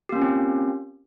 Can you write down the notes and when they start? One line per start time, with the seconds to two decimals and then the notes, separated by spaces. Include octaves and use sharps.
0.09 G4
0.12 A#3
0.15 C#4
0.19 F4
0.22 C4